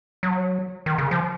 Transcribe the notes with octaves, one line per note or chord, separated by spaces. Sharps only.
F#3
D#3
C#3
F3